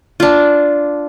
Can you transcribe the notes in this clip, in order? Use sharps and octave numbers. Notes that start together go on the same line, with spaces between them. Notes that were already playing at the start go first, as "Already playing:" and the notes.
D4 F4